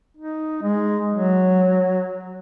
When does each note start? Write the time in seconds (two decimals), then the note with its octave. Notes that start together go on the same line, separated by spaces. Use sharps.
0.17 D#4
0.63 G#3
1.13 F#3